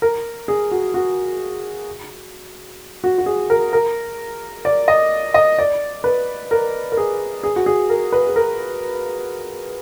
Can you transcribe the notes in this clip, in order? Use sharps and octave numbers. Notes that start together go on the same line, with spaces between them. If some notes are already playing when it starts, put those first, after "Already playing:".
A#4
G#4
F#4
F#4
F#4
F#4
G#4
A#4
A#4
D5
D#5
D#5
D5
B4
A#4
A#4
G#4
G#4
F#4
G#4
A#4
B4
G#4
A#4